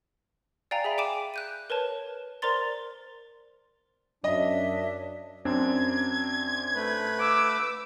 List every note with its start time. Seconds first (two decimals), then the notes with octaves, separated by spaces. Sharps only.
0.71 D5 F5 G5 G#5 A#5
0.84 G#4 E5 B5
0.98 G5 G#5 D6 D7 E7
1.34 F#6 G6 D#7
1.70 A#4 B4 C#5 A5
2.42 A#4 C5 D5 A#5 C6 A6
4.24 F#2 D4 C#5 D#5 E5
5.45 F#2 C4 D4 G#6
6.75 A3 B4
7.20 D6 E6